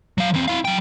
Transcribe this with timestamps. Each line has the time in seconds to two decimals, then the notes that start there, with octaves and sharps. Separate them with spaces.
0.18 F#3 F5
0.34 E2 C4
0.48 E4 F5
0.65 F#3 G5